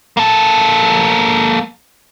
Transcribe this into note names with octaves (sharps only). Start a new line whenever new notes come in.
A#3 A4